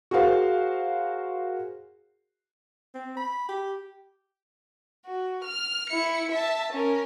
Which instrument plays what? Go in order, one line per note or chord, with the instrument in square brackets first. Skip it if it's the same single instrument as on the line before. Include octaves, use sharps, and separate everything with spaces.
[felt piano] F#4 G#4 A#4 C5 F5
[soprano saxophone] C4
B5
G4
[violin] F#4
F6
E4 C#7
E5 A5
C#4 A#4